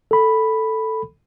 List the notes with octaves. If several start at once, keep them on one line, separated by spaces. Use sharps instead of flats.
A4 B5